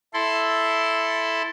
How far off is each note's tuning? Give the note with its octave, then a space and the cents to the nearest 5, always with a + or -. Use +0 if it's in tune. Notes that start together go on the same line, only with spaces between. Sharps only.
E4 +0 A4 +0 C6 +0